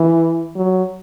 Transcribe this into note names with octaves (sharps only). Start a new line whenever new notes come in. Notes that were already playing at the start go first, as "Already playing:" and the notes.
Already playing: E3
F#3